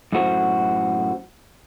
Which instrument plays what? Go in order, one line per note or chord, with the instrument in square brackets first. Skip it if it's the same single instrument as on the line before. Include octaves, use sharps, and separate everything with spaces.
[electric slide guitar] F#2 A2 F#4 C5